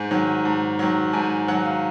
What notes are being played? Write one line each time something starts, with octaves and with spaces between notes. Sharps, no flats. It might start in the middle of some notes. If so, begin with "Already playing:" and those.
Already playing: G#2 G#5
D#3 F#3
G#2
D#3 F#3
G#2 G#5
D#3 F#3 F#5
F5